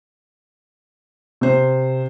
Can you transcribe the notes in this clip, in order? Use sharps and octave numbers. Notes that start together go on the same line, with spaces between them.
C3 C5